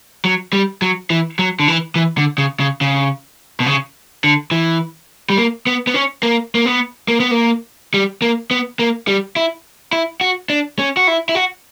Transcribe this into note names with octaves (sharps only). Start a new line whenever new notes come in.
F#3
G3
F#3
E3
F#3
D3
E3
E3
D3
C#3
C#3
C#3
B2
C#3
D3
E3
G3
A#3
B3
B3
C#4
A#3
A#3
B3
A#3
B3
A#3
G3
A#3
B3
A#3
G3
E4
E4
F#4
D4
C#4
F#4
E4
E4
F#4